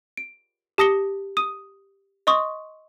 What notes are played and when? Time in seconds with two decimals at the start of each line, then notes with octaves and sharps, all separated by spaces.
0.17 D7
0.78 G4 A5 D#6 A#6 C#7 G7
1.37 D#6 D#7
2.27 D#5 C6 C#6 D#6